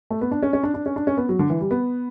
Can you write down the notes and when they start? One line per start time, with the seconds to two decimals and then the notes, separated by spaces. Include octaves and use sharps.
0.10 A3
0.21 B3
0.31 D4
0.43 C#4
0.53 C#4
0.63 D4
0.74 D4
0.86 C#4
0.96 D4
1.07 C#4
1.17 B3
1.29 F#3
1.39 D3
1.50 E3
1.61 G3
1.71 B3